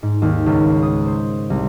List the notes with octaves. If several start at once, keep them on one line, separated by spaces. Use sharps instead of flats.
G#2
D#2
C#2
D#6
C5
C2